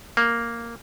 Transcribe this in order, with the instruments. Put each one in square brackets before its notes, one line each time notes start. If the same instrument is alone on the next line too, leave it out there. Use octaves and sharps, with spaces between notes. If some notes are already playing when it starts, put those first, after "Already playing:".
[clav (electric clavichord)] A#3